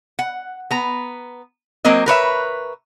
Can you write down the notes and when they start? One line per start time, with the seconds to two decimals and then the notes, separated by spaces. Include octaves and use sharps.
0.19 F#5
0.71 B3 A#5
1.85 F#3 A#3 C4 A#4 D#5
2.06 A#4 B4 C#5 E5